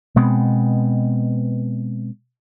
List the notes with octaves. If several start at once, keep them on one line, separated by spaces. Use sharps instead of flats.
B2 G#3 B3 C4